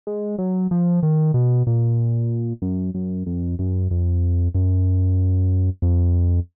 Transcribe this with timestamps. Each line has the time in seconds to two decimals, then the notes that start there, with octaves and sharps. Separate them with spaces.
0.07 G#3
0.38 F#3
0.71 F3
1.03 D#3
1.34 B2
1.67 A#2
2.62 F#2
2.94 F#2
3.26 F2
3.59 F#2
3.91 F2
4.55 F#2
5.82 F2